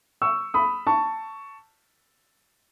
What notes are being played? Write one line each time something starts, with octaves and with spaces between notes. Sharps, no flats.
C#6 E6
B5 D#6
A5 C#6